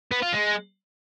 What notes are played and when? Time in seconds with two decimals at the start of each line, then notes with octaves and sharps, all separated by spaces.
0.11 B3
0.22 F4
0.33 G#3